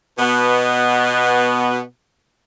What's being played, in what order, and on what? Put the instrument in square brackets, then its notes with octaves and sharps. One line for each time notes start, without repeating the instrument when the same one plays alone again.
[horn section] B2 B3